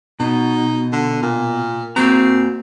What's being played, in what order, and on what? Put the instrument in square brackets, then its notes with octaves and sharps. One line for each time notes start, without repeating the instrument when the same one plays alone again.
[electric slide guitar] B2 [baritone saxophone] D#4
[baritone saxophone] D3
A#2
[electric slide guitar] A#3 F#4 A#5 [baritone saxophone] C4